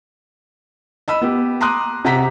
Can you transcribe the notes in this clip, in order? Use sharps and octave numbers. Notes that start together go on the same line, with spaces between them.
D#5 B5 E6
B3 G4
A#5 C6 D6 D#6 F#6
C3 F#5 A#5 B6